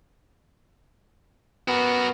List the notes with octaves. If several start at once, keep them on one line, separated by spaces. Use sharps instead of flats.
B3 F#4 A#4